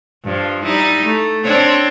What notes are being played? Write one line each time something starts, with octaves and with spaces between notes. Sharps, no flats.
G2 F3
G3 D#4 E4
A3
C4 D4 C#5